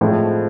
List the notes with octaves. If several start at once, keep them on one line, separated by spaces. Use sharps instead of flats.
A2 F3 G#3 C4